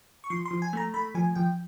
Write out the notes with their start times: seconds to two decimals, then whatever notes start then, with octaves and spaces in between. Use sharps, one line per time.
0.24 C#6
0.30 F3 C6
0.46 C6
0.51 F3
0.62 G#5
0.73 A3 A#5
0.94 A3 B5
1.15 F3 G#5
1.35 F3 G5